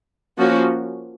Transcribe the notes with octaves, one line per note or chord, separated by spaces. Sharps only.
F3 A#3 C#4 F#4